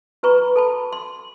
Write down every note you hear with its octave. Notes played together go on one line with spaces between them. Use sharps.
F#4 B4 A#5 B5 C#6
A4 A5 B5
C6